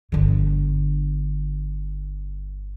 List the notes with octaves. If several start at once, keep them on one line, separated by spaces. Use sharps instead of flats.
G1 D3